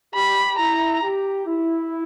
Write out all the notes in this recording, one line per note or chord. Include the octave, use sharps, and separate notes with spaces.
G4 B5
E4 A#5
G4
E4